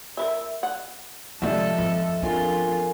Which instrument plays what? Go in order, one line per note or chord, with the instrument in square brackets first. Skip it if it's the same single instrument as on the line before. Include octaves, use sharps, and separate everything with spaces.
[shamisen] A#4 B4 E5
F#5
[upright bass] C3 G#3 [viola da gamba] F3 A4 [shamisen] G3 F#4 [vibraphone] D#5 E5
[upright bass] F2
[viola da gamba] F2 F4 [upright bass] B3 D4 [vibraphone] A4 A#4 G#5